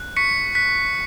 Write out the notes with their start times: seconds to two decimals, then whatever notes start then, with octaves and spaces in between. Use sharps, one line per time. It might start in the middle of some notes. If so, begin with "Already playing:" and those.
Already playing: F#6
0.17 C#6 B6 C#7
0.55 F#6 B6